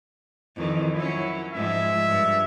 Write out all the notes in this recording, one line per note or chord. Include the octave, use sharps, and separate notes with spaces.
F2 D#3 E3
F#3 C#4 E4
G#2 F3 G#3 E5
G2